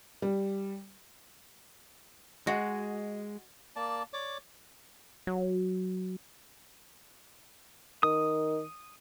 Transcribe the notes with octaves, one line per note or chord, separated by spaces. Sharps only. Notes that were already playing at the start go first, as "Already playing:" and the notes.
G3
G#3 F#4 D#5
A#3 D5 A5
C#5 D5 D6
F#3
D#3 D#6